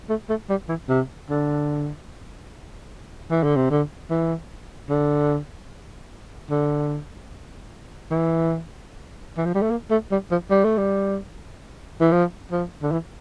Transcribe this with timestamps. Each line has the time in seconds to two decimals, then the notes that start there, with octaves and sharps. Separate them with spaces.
0.09 A3
0.29 A3
0.49 G3
0.69 E3
0.89 C3
1.30 D3
3.30 E3
3.43 D3
3.56 C3
3.70 D3
4.10 E3
4.89 D3
6.50 D3
8.11 E3
9.37 E3
9.45 F3
9.55 G3
9.62 A3
9.70 A#3
9.91 A3
10.11 G3
10.31 F3
10.50 G3
10.64 A3
10.78 G3
12.01 E3
12.12 F3
12.52 F3
12.82 D3
12.92 E3